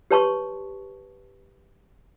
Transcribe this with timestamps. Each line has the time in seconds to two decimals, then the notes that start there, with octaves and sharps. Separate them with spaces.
0.11 G4 B4 C#5 A5 C6 C#6